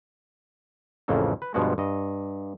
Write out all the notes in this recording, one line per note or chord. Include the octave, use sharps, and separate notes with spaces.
A1 F2 C#3 E3 A#3 A4
B4
G2 B2 F3 G#3 F#4
G2 D#5